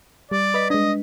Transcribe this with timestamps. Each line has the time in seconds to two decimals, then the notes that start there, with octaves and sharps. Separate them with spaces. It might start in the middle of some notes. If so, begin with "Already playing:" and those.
0.31 G3 D5
0.54 B4 D#5 B6
0.70 G#3 D4 D#5